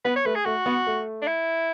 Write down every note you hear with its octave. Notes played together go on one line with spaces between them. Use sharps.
B3 B4
C#5
A3 B4
G#4
A3 F#4
B3
A3
D4
E4